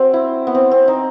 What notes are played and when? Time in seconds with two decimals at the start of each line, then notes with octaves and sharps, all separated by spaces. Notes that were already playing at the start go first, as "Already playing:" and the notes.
Already playing: C4 F#4
0.13 E4
0.47 B3
0.55 C4
0.71 C4
0.88 D#4